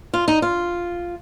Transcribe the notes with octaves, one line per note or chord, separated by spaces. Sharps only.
F4
D#4
F4